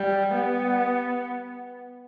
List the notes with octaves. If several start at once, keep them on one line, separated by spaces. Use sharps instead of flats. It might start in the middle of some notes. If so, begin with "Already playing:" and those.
Already playing: G3
B3